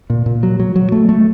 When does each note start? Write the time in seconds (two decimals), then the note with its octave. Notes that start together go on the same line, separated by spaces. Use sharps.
0.10 A#2
0.26 A#2
0.43 F#3
0.60 F#3
0.76 F#3
0.92 A3
1.09 A3